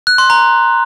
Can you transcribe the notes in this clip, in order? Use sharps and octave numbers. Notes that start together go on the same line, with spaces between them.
F#6
C6
A#5